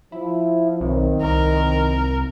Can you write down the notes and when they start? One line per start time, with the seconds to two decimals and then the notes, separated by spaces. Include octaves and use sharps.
0.12 F3 E4
0.81 B1 D#3 C4
1.22 C2 A#4